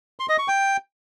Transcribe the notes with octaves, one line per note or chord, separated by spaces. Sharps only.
C6
D#5
C#6
G5